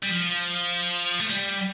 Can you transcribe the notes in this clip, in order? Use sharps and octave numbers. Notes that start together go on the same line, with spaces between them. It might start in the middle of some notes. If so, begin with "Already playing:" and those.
G3
F3
A3
G3